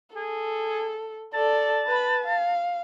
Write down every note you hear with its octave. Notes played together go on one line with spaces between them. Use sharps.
G#4 A4
A4 D5 A5
B4 B5
F5